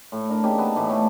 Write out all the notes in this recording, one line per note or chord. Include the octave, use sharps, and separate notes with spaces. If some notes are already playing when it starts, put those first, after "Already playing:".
A2
D4 A#4
C#3 A#3 D#4 G4
B3 A5
A2 E3 D5
A2 A3